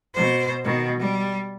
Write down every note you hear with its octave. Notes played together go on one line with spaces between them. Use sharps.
B2 C5
B2 D#3
G3